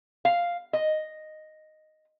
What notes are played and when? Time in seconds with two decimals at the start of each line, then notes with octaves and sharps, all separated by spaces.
0.25 F5
0.73 D#5